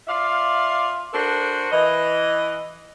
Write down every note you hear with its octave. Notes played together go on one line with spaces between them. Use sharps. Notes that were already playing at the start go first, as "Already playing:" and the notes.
F4 D5 E5 F5
D4 F#4 A4 A#4 C5
E3 D#5